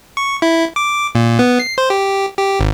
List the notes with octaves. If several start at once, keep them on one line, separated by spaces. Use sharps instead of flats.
C#6
E4
D6
A#2
B3
C7
C5
G4
G4
G#1